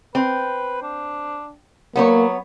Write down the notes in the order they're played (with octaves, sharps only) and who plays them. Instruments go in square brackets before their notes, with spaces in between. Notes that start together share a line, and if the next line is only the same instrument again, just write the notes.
[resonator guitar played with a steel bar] C4 [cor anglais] B4
[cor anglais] D4
[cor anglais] F#3 [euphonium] A#3 [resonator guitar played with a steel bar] B3 C5 C#5